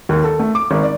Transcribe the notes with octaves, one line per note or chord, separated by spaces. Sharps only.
D#2
A4
A3
D6
G#1
D5